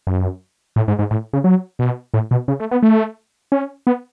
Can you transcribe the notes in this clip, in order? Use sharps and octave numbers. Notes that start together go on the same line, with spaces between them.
F#2
A2
G#2
G#2
A2
C#3
F#3
B2
A2
B2
C#3
A3
B3
A3
C#4
B3